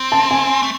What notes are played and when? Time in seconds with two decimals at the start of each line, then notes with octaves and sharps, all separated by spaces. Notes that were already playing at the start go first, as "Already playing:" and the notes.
Already playing: C4
0.12 A5
0.31 G#5
0.63 A3